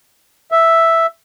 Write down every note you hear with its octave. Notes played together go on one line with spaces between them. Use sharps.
E5